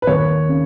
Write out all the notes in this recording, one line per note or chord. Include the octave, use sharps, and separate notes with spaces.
B4
D#2 C#5
C#3